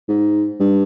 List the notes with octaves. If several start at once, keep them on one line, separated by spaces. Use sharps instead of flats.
G#2
G2